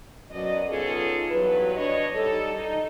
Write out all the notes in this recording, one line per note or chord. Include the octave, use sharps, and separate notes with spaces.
F#2 B2 F#3 D5 D#5
B3 C#4 D#4 F4 G#4 A4
E2 G2 F#3 B4
D4 C#5 D#5
G3 D#4 A4
D#4